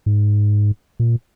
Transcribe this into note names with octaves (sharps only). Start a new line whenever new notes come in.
G#2
A#2